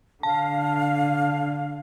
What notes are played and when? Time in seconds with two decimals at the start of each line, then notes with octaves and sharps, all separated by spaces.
0.23 D3 F5 A5